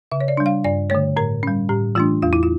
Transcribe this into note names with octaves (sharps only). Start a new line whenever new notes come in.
C#3 E5
C#5
D5
G3 D4
F5
G2 D5
D3 A3 C#5
A2 A#4
G3 C#4
A2 G4
E3 A3 D4 F4
E2 F4
E4
F4